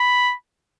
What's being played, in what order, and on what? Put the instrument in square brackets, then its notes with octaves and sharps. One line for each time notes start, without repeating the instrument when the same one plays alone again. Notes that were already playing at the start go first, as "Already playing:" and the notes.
Already playing: [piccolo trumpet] B5